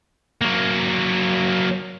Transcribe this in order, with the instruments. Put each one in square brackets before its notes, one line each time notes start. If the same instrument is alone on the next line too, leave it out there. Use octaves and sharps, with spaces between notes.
[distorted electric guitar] F#3 A#3